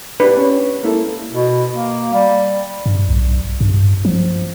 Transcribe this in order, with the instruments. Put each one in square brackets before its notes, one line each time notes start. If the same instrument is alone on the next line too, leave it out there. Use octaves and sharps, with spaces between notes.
[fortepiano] D4 G4 [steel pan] B4
[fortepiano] C#4
A#3 E4 A4
[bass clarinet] B2
A#3
G3
[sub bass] G2
B1
G2
F3